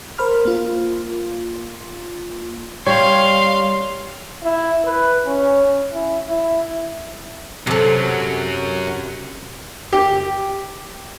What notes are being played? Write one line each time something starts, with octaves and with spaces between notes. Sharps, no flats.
A#4 C5 B5 F6
A#3 F4
G3 C#5 F5 C6
E4
B4
C#4
E4
E4
F#2 C3 F#3 A4
G4